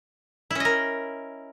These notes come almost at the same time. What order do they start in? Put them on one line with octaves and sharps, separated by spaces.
E4 C#4 D#5 A#4